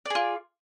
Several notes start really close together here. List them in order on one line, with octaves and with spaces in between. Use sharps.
D5 G#4 F4